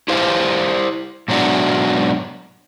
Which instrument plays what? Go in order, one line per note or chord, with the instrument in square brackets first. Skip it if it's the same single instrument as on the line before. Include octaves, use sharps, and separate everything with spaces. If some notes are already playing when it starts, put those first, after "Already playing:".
[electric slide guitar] E4 G4 C5 F5
G#2 B2 F#3 D4 F#4